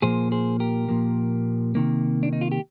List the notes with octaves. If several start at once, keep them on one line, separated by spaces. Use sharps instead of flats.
A#2 F3 A#3 G#4 C5
G#4 C5
G4 A#4
A#2 F3 A#3
C3 D#3 A#3
D4
D#4
F4
G4